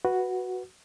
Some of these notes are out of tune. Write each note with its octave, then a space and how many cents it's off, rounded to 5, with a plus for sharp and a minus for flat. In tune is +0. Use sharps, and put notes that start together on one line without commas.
F#4 +0 B4 -5